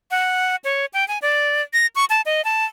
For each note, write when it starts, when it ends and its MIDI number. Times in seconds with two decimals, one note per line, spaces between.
0.11 0.56 78
0.64 0.86 73
0.93 1.07 79
1.08 1.18 80
1.22 1.62 74
1.73 1.87 94
1.96 2.05 85
2.10 2.21 81
2.26 2.44 75
2.45 2.65 81